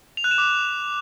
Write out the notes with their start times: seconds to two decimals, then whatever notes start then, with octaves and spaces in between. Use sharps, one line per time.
0.17 F7
0.24 F#6
0.31 E7
0.38 D6